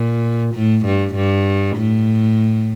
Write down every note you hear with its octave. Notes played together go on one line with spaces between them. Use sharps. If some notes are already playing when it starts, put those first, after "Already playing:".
Already playing: A#2
A2
G2
G2
A2